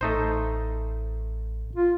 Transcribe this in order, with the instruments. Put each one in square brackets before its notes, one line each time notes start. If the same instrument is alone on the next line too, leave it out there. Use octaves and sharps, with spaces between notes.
[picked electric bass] A1 [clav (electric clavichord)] A3 D#4 C5
[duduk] F4